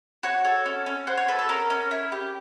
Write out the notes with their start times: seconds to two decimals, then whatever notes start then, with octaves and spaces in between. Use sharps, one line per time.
0.23 F#4 C#5
0.45 A4 C#5
0.66 C#4
0.86 C#4
1.07 F#4 C5
1.17 C#5
1.28 A4 B4
1.39 A4
1.49 C#4 A#4
1.70 C#4
1.91 E4
2.12 G4